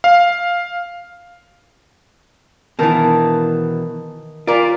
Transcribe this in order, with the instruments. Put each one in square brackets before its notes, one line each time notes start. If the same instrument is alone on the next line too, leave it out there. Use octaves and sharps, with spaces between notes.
[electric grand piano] F5
[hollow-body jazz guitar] B2 E3 [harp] D#3 A#4 A5
[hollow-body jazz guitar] F4 A#4 [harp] D5